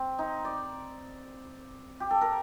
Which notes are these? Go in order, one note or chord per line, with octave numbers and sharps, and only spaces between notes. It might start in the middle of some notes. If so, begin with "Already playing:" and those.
Already playing: C4
D#4
D5
G4
A4
A#4